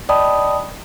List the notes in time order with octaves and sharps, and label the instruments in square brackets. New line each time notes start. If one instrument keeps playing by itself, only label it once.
[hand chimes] D5 D#5 G5 A5 B5 D#6